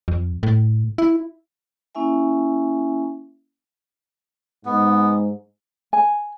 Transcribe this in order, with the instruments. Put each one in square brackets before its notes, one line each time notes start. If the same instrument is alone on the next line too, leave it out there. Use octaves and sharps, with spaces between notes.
[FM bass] F2
A2
E4
[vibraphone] A#3 C#4 E4 E5 G#5
[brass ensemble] G#2 [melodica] B3
[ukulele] G#5